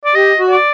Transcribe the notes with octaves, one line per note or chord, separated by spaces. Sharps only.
D5
G4 D#5
F#4
D5